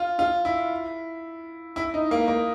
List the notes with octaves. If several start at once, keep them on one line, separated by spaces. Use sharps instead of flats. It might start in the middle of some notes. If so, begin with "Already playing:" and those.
Already playing: F4
F4
E4
E4
D#4
A#3
A#3